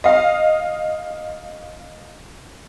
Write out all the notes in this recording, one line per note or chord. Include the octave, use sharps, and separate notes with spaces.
D#5 F5